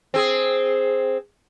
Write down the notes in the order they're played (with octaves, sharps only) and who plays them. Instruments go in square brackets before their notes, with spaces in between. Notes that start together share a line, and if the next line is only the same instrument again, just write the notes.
[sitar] C4 G#4